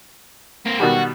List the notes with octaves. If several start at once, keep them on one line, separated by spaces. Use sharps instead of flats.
A#3 C4
B2 D#3 G3 F#4